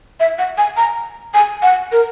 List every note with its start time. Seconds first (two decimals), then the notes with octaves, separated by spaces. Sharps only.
0.20 E5
0.39 F#5
0.58 G#5
0.77 A#5
1.34 G#5
1.62 F#5
1.92 A#4